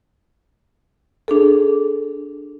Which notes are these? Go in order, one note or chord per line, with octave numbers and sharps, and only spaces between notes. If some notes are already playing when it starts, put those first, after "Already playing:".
D4 G#4 A4